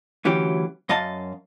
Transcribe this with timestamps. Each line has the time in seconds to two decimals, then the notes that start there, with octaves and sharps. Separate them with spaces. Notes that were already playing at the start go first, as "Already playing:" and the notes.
0.25 D2 E3 F#3 C#4 G4
0.89 F#2 D#5 F5 A5